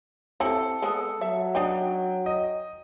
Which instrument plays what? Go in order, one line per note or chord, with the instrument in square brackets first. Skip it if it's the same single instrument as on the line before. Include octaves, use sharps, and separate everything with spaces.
[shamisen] C4 E4 G4 [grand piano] A4
[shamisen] G#3 B3
[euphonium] F#3 [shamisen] E5
[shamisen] D4 D#4 [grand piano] G5
[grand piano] D#5